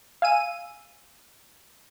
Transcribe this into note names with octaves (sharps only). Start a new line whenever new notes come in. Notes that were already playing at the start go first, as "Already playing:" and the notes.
F5 G#5 E6 D#7